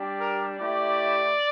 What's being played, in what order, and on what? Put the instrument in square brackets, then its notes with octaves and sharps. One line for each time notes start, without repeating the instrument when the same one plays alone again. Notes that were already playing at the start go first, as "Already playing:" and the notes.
Already playing: [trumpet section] G3 D4 G4
A#4
A3 E4 G4 D5